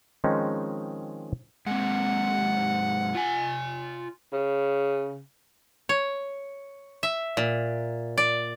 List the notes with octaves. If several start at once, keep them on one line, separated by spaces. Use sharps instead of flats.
D#3 F3 G#3 C4 C#4 D#4
G#2 C3 F#5
F4 G#5
C#3
C#5
E5
A#2
D5